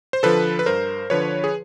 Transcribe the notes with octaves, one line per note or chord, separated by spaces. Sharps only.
C5
D3 F3 A4 B4
B4
G2 A#4 C5
D3 F3 B4 C#5
G#4